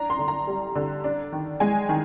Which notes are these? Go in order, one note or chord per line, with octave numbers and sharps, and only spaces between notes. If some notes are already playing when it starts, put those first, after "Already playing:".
Already playing: D4 A#5
C6
D3
A#5
G3
D3
D4
D#3
G#3 G#5
D#3